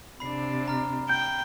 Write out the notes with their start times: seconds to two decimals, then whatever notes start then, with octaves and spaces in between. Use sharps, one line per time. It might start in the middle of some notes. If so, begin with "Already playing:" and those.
0.20 C3 D4 B5 C7
0.68 A#5 F6
1.09 G5 G6